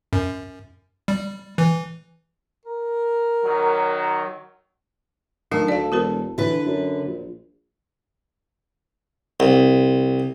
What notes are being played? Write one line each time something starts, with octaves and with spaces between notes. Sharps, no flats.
F#2
G3
E3
A#4
D#3 F#3
D#3 F#3 A3 D4 A4
D2 D5 F5
E1 F#4 A#4 C5
D3 E3 B4
F#2
A#1
C2